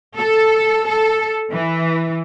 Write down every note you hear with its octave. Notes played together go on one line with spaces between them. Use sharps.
A4
A4
E3